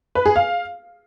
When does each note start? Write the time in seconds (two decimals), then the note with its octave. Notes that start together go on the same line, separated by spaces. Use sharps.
0.15 B4
0.26 G#4
0.36 F5